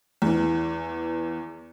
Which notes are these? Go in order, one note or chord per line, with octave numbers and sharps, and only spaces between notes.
E2 E3